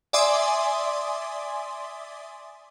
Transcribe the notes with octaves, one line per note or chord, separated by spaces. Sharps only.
D5 E5 G#5 C6 D6 D#6